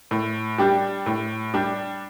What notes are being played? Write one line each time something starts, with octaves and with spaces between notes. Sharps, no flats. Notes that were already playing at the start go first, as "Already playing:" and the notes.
A2
G3 D4 G4
A2
G3 D4 G4